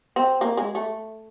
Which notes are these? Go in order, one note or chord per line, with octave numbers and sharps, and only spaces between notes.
C4
A#3
G#3
A3